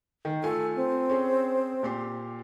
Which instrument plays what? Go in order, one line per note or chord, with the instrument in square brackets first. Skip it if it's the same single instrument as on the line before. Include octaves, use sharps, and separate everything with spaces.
[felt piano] D#3
[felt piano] A3 F4 G#5 [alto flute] A4
[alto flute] C4
[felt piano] C#4 G#4
A#2 G4 C6